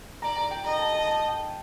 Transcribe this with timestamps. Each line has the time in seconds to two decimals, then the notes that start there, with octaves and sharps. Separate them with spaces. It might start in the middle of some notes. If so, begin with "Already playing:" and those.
0.22 D5 A#5
0.36 A#5
0.51 G5
0.64 D#5 A#5
0.78 A5
0.93 A5
1.07 A5
1.28 G5